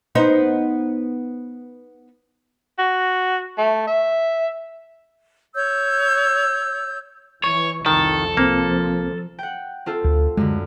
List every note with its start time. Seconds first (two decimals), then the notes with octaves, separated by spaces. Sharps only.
0.15 B3 D#4 C5
2.79 F#4
3.58 A3
3.87 E5
5.55 C#5 E6 G6
7.44 E3 C#5 C#6
7.86 C2 F2 D#3 A4
8.37 C2 F3 A#3 C4
9.39 F#5 G5
9.86 C4 F4 A4
10.04 D2
10.37 F#2 D3 G#3